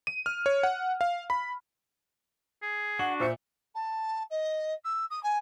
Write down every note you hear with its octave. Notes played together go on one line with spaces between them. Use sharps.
D#7
F6
C#5
F#5
F5
B5
G#4
D4 F#4 F#5 F#7
A#2 C5 E5 C#7
A5
D#5
E6
D#6
G#5